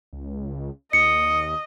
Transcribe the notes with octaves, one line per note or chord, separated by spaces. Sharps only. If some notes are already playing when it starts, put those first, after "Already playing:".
C#2
D#2 D#5 C#7